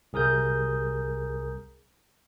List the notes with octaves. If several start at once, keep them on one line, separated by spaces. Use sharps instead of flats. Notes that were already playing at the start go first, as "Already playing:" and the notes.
C2 G#4 A#4 D#6 G6